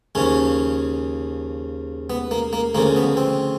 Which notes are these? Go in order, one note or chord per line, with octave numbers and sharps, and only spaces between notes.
D#2 C#3 F3 C#4
B3
A#3
A#3
D2 C#3 F3 A#3
B3
C4